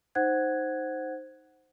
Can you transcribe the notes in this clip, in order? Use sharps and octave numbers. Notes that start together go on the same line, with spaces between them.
D#4 C5 F#5 F#6 G#6